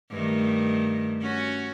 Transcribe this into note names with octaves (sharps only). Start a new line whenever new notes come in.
G2 D#3 A3
C#4 F#4